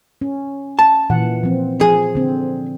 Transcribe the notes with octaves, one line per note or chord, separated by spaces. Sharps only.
C#4
A5
A#2 E3 F#5
F3 C4
F3 G#4
D3 C4